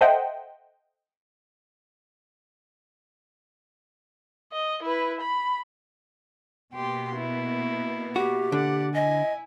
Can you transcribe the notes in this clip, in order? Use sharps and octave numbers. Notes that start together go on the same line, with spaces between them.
A4 C5 D#5 E5 F#5 G5
D#5
E4 B4
B5
B2 A#3 B3 G4 C6
E4
F#4 G4
D3 D5 F#5
E4 D#5 G#5